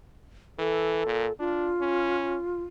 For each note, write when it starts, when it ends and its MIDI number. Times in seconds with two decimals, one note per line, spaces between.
0.59 1.02 52
0.59 1.32 69
1.06 1.28 46
1.39 1.72 62
1.39 2.63 65
1.81 2.37 61